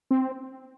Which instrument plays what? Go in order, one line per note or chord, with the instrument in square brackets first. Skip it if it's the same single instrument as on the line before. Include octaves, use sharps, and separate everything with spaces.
[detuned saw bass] C4